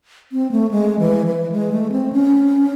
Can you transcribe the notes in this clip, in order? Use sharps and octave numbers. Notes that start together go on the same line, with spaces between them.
C4
A3
G#3
E3
E3
G#3
A3
C4
C#4